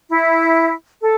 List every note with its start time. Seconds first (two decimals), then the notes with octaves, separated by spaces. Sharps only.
0.09 E4
1.01 A4